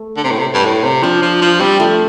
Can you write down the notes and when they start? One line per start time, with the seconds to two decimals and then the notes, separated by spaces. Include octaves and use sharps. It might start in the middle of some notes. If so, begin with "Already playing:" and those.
Already playing: A3
0.17 D3
0.24 C3
0.31 A2
0.38 C3
0.54 G2
0.65 A2
0.83 C3
1.03 F3 D4
1.22 F3
1.41 F3
1.60 G3 C4
1.80 F3 A3